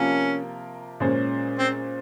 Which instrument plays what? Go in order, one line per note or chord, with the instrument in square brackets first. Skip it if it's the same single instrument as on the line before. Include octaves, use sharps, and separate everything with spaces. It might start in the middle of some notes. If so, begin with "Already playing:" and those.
Already playing: [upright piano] C3 F3 A#3 F4 A#4 [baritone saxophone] C#4
[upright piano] A#2 G#3 C#4 G#4 C5
[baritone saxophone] C4